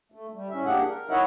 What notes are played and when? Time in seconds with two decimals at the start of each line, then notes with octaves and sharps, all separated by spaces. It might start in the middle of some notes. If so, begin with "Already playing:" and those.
0.12 A3
0.33 G3
0.50 A2 C#4 E5
0.65 A#3 D4 G4 G#4 F#5
0.88 A#4
1.10 D#4 E4 C#5 D#5 E5 F#5